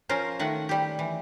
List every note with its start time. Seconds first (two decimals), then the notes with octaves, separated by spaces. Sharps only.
0.09 F3 C#4 F4 A#4 C5
0.39 D#3 A3 F#5
0.69 G3 G4
0.99 E3